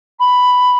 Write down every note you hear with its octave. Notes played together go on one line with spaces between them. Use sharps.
B5